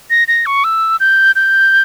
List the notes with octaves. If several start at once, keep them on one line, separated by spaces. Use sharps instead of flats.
A#6
A#6
C#6
E6
G6
G6